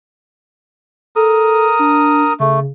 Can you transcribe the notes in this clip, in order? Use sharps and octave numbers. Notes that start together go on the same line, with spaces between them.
A4 A#4 D#6
D4
C#3 A3